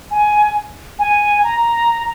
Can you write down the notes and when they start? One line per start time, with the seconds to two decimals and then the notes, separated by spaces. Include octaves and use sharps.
0.11 G#5
0.99 G#5
1.44 A#5